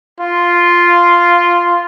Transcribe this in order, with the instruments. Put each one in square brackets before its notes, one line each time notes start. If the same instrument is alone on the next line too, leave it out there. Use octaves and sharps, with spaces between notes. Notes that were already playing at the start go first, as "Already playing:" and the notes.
[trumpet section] F4